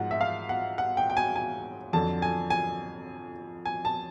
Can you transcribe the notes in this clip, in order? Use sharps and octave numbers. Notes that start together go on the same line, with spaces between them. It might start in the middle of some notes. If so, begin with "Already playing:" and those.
Already playing: G#2 F3 F#5
E5
F5
F#5
F#5
G5
G5
G#5
G#5
F2 D3 F#3 A5
G#5
G#5
G#5
A5